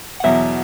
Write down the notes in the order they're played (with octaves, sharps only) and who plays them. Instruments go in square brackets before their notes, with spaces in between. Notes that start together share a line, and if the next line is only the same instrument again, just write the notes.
[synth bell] F#5
[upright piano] E2 B2 F#3 [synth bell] E5